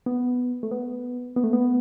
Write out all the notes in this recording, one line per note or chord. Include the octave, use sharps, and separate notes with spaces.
B3
A3
B3
B3
A3
B3